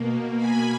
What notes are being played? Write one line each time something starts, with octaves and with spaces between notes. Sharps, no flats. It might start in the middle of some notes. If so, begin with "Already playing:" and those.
Already playing: B2 A#3
G#5 B5